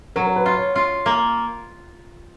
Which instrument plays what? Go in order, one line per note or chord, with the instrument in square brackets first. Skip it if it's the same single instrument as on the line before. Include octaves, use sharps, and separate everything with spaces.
[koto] F#3 [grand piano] A#4
[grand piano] A#4
B4
[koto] F4
[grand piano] C#5
[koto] F4
A#3